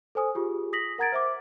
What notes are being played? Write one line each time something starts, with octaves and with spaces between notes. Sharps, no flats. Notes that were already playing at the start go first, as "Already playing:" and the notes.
A4 C5 G#5 D#6
F4 G4 G#4
D#6 A#6 B6 F#7
A#4 F#5 A#5 G#6 A6 D7
C5 E5 D6